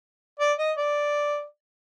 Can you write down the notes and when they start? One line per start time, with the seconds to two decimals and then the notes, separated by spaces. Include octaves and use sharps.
0.39 D5
0.58 D#5
0.77 D5